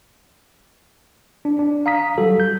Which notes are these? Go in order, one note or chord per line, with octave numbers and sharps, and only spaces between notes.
D4
D4
F5 A#5 D#6 B6
F#3 G3 F#4 A4
G6